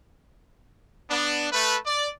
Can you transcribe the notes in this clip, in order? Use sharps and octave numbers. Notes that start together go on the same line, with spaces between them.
B3 D4
A3 B4
D5